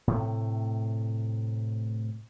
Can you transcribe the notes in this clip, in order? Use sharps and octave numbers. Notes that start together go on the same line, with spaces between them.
A2 C3 A3